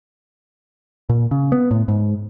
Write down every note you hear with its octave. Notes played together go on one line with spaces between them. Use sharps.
A#2
C#3
B3
A2
G#2